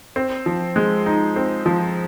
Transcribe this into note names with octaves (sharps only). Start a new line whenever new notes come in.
C4
F3
G#3
D#4
C4
F3